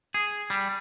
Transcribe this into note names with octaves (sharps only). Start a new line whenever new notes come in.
G#4
G3